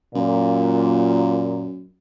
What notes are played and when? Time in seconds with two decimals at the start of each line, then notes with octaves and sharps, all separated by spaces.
0.15 F#2 A#2